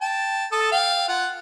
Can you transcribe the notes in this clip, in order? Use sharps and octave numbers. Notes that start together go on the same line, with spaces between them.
G5 A5
A4 A5 D#6
F5 G5
F4 F#5